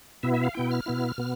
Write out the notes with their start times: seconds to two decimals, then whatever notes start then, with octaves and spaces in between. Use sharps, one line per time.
0.23 B2 B3 E4 E5
0.34 E5
0.43 F5
0.54 B2 B3 E4 G5
0.71 F6
0.86 B2 B3 E4
1.18 B2 B3